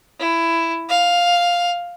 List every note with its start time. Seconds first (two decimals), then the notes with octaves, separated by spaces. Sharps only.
0.20 E4
0.89 F5